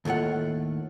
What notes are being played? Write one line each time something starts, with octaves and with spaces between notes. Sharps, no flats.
D#2 A2 A3 F4 F#5